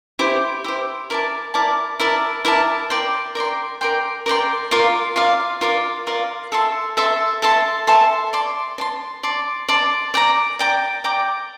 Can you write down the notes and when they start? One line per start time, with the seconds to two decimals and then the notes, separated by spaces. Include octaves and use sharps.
0.19 E4 G4 C5
0.64 E4 G4 C5
1.10 E4 A#4 D5 A5
1.54 E4 A#4 D5 A5
2.00 E4 A#4 D5 A5
2.45 E4 A#4 D5 A5
2.90 A#4 D5 G5 C6
3.35 A#4 D5 G5 C6
3.81 A#4 D5 G5 C6
4.26 A#4 D5 G5 C6
4.71 F4 A#4 D5 F5
5.16 F4 A#4 D5 F5
5.61 F4 A#4 D5 F5
6.07 F4 A#4 D5 F5
6.52 A4 E5 A5 C6
6.97 A4 E5 A5 C6
7.42 A4 E5 A5 C6
7.87 A4 E5 A5 C6
8.33 D5 A5 C6
8.78 D5 A5 C6
9.23 D5 A5 C6
9.69 D5 A5 C6
10.14 D5 G5 A#5 D6
10.59 D5 G5 A#5 D6
11.04 D5 G5 A#5 D6